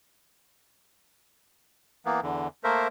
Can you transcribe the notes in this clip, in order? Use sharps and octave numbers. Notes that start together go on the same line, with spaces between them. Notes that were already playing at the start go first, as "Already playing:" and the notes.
E3 A#3 B3
E2 D3
A3 A#3 A#4 C5 E5